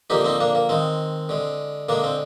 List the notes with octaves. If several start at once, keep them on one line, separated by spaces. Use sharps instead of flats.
D3 F3 A#3 D#4 G4
C4 D#4
A#3 D4
A#3
D#3 G#3 C4
D3 G#3
D3 G#3 A#3 D4
C4